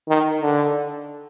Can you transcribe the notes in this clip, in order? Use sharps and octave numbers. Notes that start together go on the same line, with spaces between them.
D#3
D3